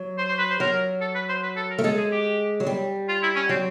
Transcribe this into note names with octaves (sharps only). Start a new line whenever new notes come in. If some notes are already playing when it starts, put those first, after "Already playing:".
Already playing: F#3
C5
C5
B4
C5
F#3 A#4
A4
B4
C5
B4
A4
A#4
A3
G#3 A4
G#4
G4
F#3
G3
F4
E4
C#4
F#3 C4